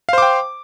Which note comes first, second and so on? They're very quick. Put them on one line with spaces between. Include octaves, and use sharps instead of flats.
F5 C5 D6 G5